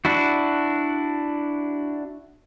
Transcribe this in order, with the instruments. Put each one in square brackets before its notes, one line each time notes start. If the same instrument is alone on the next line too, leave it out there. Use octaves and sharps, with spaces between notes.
[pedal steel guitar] D4 E4 F#4